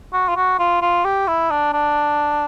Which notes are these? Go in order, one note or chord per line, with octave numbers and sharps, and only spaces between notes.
F#4
F4
F#4
F4
F4
G4
E4
D4
D4